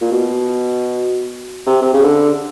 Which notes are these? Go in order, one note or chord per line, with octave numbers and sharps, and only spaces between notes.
A#2
B2
C3
C3
C#3
D3